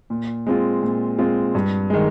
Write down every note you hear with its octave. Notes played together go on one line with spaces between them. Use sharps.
A#2
G#3 C4 F4
A#2
G#3 C4 F4
G2
D#3 G#3